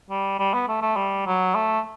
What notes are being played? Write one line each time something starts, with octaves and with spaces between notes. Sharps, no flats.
G3
G3
B3
A3
A3
G3
F#3
A3